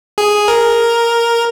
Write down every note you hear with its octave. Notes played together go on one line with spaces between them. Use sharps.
G#4
A#4